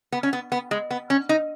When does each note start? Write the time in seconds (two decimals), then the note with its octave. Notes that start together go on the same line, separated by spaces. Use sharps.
0.12 B3
0.23 C#4
0.33 B3
0.52 B3
0.71 G#3
0.91 B3
1.10 C#4
1.29 D#4